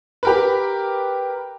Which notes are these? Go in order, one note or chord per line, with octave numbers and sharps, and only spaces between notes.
G4 A#4 B4